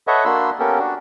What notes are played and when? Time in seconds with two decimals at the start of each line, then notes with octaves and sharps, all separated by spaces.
0.07 A4 B4 C#5 D#5 E5 F#5
0.25 A#3 D4 F#4 B5 C6 E6
0.59 A#3 B3 C#4 G4 A4 A#4
0.79 D4 F#4